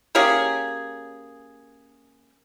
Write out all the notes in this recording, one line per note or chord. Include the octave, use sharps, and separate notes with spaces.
A#3 C#4 G4 G#4